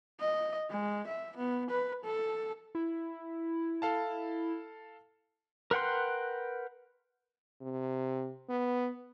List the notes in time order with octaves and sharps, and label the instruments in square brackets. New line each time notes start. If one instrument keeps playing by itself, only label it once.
[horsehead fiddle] D#5
G#3
E5
B3
B4
A4
[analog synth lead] E4
[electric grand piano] A4 F5 A5
[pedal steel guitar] A#4 B4 F#5 G5 C6
[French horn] C3
B3